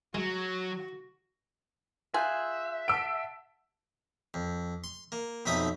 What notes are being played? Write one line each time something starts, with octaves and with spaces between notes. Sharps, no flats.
F#3 G#3 F#4
F4 G#4 E5 G#5 C6 F#6 G6
F#5 A5 E6 D7
F2
C6
A#3
B1 F2 D#4 E5 B5 D#6